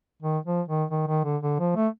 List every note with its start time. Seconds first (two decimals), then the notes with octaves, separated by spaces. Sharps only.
0.22 D#3
0.46 F3
0.68 D#3
0.91 D#3
1.08 D#3
1.25 D3
1.43 D3
1.59 F3
1.76 A3